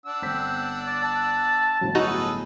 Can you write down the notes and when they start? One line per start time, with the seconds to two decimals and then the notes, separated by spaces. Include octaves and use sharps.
0.06 D4 F#5 E6
0.22 G1 C4 B6
0.87 D5
1.03 A5
1.81 G1 A2 F#3
1.95 D#4 F#4 G#4 A4 B4